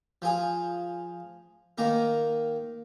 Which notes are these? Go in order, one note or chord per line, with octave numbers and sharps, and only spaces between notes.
F3 G#4
D#3 A#3 A#4